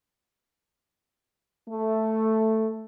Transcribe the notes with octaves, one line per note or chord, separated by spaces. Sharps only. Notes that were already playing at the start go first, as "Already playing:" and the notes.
A3